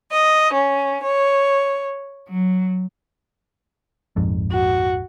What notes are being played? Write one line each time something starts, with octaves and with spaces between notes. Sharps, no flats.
D#5
C#4
C#5
F#3
A#1 F2 G#2
F#4